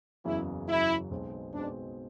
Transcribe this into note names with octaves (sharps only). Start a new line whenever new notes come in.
F#1 E2 C#3 F#3 E4
F#1 E2 C#3 F#3 E4
B1 B2 G#3 C4
B1 B2 G#3 C4 D4